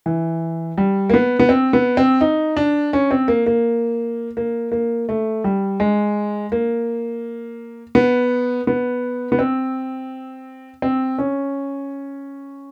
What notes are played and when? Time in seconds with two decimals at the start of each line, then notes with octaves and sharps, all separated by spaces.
0.06 E3
0.78 G3
1.10 A#3
1.14 B3
1.40 B3
1.49 C4
1.73 B3
1.97 C4
2.21 D#4
2.57 D4
2.93 C#4
3.11 C4
3.28 A#3
3.46 A#3
4.37 A#3
4.72 A#3
5.09 A3
5.44 G3
5.80 G#3
6.52 A#3
7.95 B3
8.67 B3
9.32 B3
9.39 C4
10.82 C4
11.18 C#4